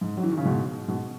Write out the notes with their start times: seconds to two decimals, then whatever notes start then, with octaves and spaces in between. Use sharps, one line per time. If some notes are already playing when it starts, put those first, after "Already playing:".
0.01 G#2
0.17 F#3
0.23 E3
0.31 D#3
0.38 C#3
0.45 G#2 B2
0.88 G#2 B2